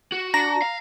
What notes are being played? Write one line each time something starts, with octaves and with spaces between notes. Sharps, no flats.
F#4
D4 A#5 A#6
F5